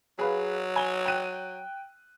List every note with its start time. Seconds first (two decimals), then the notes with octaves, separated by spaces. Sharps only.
0.19 F#3 G#4 B4 F5
0.76 G#5 G7
1.05 G5 F#6 D#7